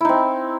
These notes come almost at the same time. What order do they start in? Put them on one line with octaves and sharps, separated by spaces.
E4 D#4 C4